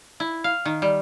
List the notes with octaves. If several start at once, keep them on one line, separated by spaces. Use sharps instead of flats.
E4
F5
D#3
G3